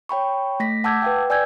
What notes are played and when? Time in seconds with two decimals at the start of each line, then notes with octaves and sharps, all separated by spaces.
0.09 C#5 G5 B5 C#6
0.60 A3 A#6 B6
0.84 F#5 A5 D6 E6 G6 G#6
1.02 B4 F5 G5
1.30 D5 G#5 E6 G6 G#6